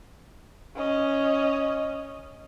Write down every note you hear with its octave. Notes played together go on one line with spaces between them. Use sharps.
C#4 D#5